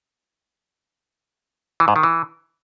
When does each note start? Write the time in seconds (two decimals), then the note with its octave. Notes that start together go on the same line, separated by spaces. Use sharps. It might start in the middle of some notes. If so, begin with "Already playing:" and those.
1.80 E3
1.88 G#2
1.96 D#3
2.03 E3